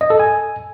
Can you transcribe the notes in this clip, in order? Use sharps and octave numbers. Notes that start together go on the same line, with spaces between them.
D#5
A4
G#5